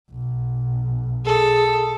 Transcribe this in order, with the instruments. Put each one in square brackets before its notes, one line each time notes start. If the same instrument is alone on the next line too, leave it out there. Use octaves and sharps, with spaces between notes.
[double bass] B1
[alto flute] G#4 [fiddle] A4